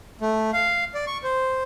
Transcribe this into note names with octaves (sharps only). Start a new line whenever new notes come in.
A3
F5
D5
C#6
C5